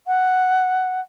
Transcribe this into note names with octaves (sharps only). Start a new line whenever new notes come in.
F#5